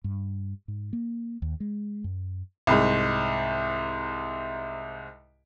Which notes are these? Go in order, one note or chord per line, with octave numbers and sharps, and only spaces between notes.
G2
G#2
A#3
D#2
G#3
F#2
C2 G#2